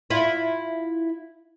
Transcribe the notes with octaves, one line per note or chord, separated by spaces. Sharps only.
E4 F4